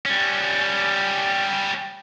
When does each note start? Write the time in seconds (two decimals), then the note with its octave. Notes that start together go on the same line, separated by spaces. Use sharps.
0.06 G3 C#4